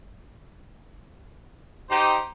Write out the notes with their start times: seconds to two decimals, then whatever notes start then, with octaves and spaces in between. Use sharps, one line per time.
1.91 D#4 G4 C5 A#5